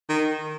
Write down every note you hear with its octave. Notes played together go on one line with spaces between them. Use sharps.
D#3